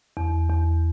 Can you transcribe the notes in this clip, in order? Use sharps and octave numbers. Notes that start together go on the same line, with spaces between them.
E2
E2